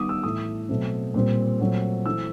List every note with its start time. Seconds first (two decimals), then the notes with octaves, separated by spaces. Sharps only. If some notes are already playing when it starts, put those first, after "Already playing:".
Already playing: D#3 G3 B3 D6 D#6
0.09 E6
0.23 A2 E3 A3 D#6
0.69 B2 F#3 A3 C4
1.14 A#2 G3 C4
1.60 A#2 F#3 A3 C4
2.06 E3 A3 C4 E6